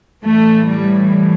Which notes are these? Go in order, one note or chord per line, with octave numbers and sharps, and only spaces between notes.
A2 E3 A3
G3